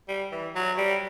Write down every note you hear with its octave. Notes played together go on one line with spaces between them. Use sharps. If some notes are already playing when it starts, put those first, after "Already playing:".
G3
E3
F#3
G3